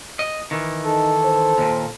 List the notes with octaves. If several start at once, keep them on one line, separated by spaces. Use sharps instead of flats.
D#5
D#3 E3
D#4 A4
C5
D#2 A#2